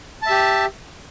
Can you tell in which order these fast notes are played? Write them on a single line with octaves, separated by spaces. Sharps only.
A5 E5 G4